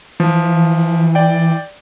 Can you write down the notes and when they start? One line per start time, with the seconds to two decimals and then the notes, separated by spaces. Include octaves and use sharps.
0.20 E3 F3
1.15 D5 G5